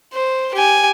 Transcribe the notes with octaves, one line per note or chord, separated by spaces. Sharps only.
C5
G4 G#5